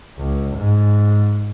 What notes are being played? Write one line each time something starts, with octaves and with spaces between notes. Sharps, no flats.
C#2
G#2